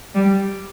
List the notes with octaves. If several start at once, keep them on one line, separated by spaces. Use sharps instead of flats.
G3